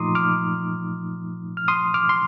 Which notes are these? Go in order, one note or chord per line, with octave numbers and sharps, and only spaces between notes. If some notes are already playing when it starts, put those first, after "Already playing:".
Already playing: A#2 F3 A3 D#4 A#5 C6 D6 D#6
D6 F6
F6
C6 D#6
D6 F6
C6